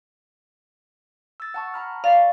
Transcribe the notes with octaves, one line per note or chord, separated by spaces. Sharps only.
E6 A6
F#5 A5 C#6
A#5 B5 F6
D5 F5 C#6 A6